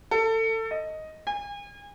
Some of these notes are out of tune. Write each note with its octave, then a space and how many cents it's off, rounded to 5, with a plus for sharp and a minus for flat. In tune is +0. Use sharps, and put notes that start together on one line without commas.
A4 +25
D#5 +5
G#5 -40